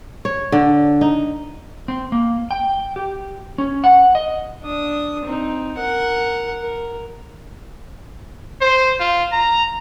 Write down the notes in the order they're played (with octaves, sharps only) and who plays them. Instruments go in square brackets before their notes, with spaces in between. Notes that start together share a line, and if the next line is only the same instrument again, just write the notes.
[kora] C#5
D3
D#4
[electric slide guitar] C4
A#3
G5
G4
C#4
F#5
D#5
[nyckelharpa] D4 D#6
C4 D#4
A#4 F#5
A#4
[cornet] C5
F4
A#5